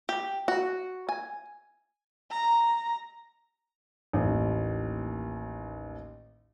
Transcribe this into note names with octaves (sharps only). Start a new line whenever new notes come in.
G4
F#4
G#5
A#5
A1 D#2